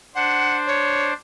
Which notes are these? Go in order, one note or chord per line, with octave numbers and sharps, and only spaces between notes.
D4 C5 F#5
C#5